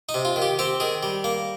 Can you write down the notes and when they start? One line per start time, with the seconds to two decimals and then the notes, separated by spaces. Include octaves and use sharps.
0.09 D#4
0.14 C3
0.25 F4
0.36 D#3
0.42 G4
0.59 C4 G4
0.80 D#3 G#4
1.03 G3
1.24 A#3